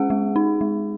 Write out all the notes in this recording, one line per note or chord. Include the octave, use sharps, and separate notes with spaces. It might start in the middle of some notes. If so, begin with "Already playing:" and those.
Already playing: G#3 C#4 G#4 F#5
G#3
D#4
G#3